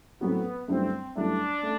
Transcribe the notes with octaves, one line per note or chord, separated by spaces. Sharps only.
A2 F#3 B3 C4 F#4
G2 D3 F#3 A3 C4 E4
G2 D3 F#3 A3 D4 E4
A3